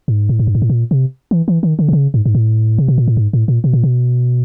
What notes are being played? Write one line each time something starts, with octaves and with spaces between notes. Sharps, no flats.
G#2
A2
G#2
G2
G#2
A2
A#2
C3
E3
E3
D#3
D3
C3
C#3
G#2
G#2
A2
C3
B2
A#2
A2
G#2
A2
A#2
B2
A#2
B2